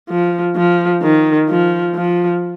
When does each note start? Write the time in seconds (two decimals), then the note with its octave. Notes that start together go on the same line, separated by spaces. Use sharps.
0.09 F3
0.56 F3
1.02 D#3
1.49 F3
1.94 F3